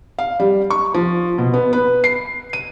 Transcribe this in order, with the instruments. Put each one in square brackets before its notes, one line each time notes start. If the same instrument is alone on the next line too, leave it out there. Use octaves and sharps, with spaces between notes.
[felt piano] F5
G3
C#6
F3
B2
B3
B4
C7
D#7